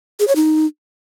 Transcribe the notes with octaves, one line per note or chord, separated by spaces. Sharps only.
G#4
C#5
D#4